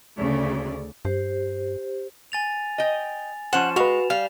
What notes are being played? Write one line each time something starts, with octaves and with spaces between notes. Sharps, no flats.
D2 C#3 A3 D5
G2 G4 C5
G#5 A6 F7
D#5 G5
F3 C#4 C5 F#5 E7
G#3 F#4 B4 F5 C#6 F7
G3 F5